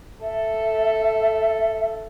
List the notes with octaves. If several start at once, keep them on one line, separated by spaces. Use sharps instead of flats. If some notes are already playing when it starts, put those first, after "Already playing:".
A4 E5